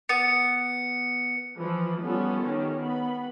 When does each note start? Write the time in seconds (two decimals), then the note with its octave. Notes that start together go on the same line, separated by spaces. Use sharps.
0.09 B3 C#7
1.59 E3 F3
2.03 G3 B3 C#4 F4 F#4 A4
2.43 D#3 C#4 G4
2.82 B3 B5